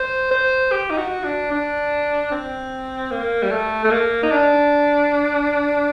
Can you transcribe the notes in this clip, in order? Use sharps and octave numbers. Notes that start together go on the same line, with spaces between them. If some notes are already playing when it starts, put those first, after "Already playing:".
Already playing: C5
C5
G4
D#4
F#4
D4
D4
C4
A#3
G3
A3
A3
A#3
D#4
D4